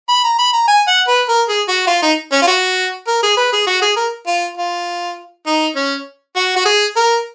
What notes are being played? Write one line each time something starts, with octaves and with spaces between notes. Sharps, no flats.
B5
A#5
B5
A#5
G#5
F#5
B4
A#4
G#4
F#4
F4
D#4
C#4
F4
F#4
A#4
G#4
B4
G#4
F#4
G#4
A#4
F4
F4
D#4
C#4
F#4
F#4
G#4
A#4